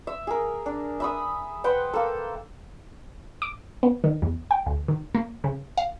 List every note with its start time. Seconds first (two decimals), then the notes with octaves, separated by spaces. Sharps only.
0.07 E5
0.27 G#4 A#4
0.66 D4
1.00 E5 B5 D#6
1.64 B4 C5 F#5 G5
1.93 A#3 A4
3.42 D6
3.83 B3
4.04 D#3
4.22 E2
4.51 G5
4.66 D2
4.88 D#3
5.15 A#3
5.44 C#3
5.77 F5